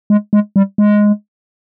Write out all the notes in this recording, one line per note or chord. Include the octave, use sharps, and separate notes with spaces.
G#3
G#3
G3
G#3